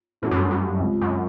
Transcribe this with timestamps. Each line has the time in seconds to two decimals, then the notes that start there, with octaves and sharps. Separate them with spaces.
0.22 A2 E3 A3 C#4 F#4
0.31 F#2
0.36 G2
0.51 F#2
0.80 C#2 C3 F3
1.01 F#2